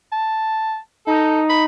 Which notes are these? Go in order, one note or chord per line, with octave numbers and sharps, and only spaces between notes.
A5
D#4 A4
B5